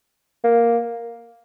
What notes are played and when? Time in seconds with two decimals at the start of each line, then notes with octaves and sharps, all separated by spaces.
0.44 A#3